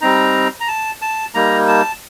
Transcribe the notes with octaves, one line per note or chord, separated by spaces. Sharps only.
G3 C4 D#4 A#5
A#5
A5
A5
G3 A#3 D#4 A#5
A5